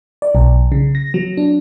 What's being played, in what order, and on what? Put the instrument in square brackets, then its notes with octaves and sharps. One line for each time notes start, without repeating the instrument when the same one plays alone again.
[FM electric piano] D5
B1
C#3
A#6
F#3
D4